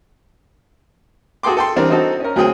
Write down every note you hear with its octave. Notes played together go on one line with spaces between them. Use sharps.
F#4 G#4 A4 G5 C6 D6
A4 G5 C6
E3 G3 C4 D4 A#4
C4 D#4 F#4 A4
C#4 A#4
D2 F#3 C4 G#4 G5 D#6